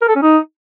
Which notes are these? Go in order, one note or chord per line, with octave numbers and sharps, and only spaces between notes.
A#4
A4
C#4
D#4